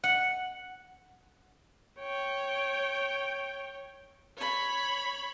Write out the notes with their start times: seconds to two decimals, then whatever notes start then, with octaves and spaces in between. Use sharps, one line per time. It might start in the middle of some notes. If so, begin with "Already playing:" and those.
0.04 F#5
2.00 C#5 G5
4.37 C#5 B5